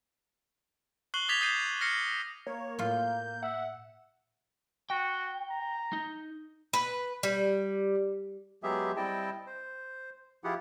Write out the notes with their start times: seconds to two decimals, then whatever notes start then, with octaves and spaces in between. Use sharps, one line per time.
1.14 C#6 F#6 C7 F#7 G7
1.28 D6 D#6 G#6 A6 B6 F7
1.41 D#6 G6 A6 B6 C7 D#7
1.81 F6 A#6 C7 C#7
2.47 A#3 C#5
2.79 A2 F4 F5 G6
3.43 E5 F#5
4.90 F#4 G5
5.50 A#5
5.93 D#4
6.73 B4
7.23 G3
8.63 F#3 G#3 B3 G4 G#4 E5
8.97 G3 C4 E4 D#5 G5 A5
9.47 C5
10.44 F3 E4 F4 G4 G#4 F#5